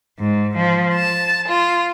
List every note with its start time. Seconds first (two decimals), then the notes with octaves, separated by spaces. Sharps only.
0.18 G#2
0.56 F3
0.94 A5
1.47 F4